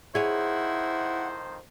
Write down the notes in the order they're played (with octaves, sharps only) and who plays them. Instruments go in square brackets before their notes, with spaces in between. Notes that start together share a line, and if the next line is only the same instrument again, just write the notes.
[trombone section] F2 D#3 C5 [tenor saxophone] E4 [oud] G#4 C#5 [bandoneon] F#5